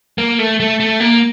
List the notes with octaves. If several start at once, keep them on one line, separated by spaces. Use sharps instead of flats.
A#3
A3
A3
A3
A#3